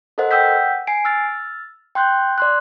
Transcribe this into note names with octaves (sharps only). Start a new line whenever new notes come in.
A4 A#4 C5 D#5 F#5
F#5 G5 D#6 E6 G6 B6
G#5 C7 D7
E6 F6 A6
G5 C6 F#6 G6
D5 C6 F#6